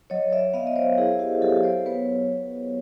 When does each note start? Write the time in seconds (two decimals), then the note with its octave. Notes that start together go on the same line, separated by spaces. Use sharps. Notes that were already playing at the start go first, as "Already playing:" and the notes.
0.10 F#3 C#5 D#5
0.32 D5 E5
0.54 B3 D#5 F5
0.67 D#5
0.76 C5 D5
0.98 E4 G#4 A#4
1.19 G4
1.42 F#3 G4 A4
1.63 C5 D5
1.86 B3 B4 C#5